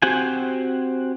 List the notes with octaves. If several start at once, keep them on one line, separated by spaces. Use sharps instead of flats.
C4 F#4 G4 F#5 G#5